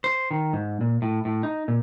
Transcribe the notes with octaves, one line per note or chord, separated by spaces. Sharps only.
C5
D#3
G#2
A#2
A2
A2
D#4
A#2